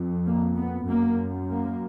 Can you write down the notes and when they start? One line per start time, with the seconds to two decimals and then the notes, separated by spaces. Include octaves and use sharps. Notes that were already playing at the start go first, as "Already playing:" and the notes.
Already playing: F2
0.26 A#3
0.58 B3
0.88 F#2 A#3
1.51 A#3